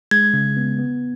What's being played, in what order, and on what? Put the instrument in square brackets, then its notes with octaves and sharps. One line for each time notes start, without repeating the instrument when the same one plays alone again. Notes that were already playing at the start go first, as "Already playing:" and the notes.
[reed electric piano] G#3 [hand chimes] G#6
[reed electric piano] C#3
B3
B3